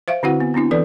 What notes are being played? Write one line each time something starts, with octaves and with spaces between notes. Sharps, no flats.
C5 E5 F5
D3 C4 E4 F#4 F#5
B3
B3 C4 D4 E4
E3 A4 B4 D5